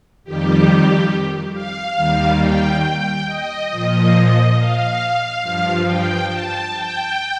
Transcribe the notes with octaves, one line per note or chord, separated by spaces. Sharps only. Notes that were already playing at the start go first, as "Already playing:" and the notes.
F2 D#3 G3 G4
F5
D#2 D#3 G3
G5
G5
D#5
A#2 F3 D#5
F5
G2 F3
G5
A5
G5